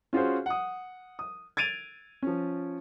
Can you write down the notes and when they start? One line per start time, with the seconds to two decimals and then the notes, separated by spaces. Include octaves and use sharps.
0.13 C#4 F4 F#4 G#4 C5
0.46 F#5 D#6
1.19 D#6
1.57 G#6 A6 D7 D#7 F7
2.22 F3 C#4